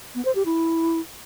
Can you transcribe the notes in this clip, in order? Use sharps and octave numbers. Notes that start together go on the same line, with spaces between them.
B3
C5
G4
E4